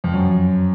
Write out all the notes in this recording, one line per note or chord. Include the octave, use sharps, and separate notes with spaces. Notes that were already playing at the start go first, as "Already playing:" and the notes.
F2
F#2